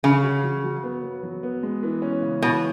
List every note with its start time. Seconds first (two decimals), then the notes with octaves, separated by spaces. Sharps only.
0.03 C#3 F#3
0.23 F#4
0.43 F#3
0.64 F#3
0.83 B3
1.03 B3
1.23 F#3
1.43 B3
1.63 G#3
1.83 E3
2.02 C#4
2.22 C#3
2.42 B2 E3